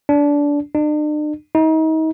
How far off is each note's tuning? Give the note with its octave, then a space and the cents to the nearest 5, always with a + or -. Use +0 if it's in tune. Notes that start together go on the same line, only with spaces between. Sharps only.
D4 -20
D4 +45
D#4 +35